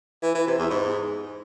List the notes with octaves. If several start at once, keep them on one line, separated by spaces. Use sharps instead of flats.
E3
E3
C3
E2
G#2